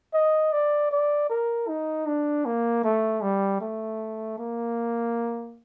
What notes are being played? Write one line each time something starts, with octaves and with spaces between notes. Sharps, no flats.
D#5
D5
D5
A#4
D#4
D4
A#3
A3
G3
A3
A#3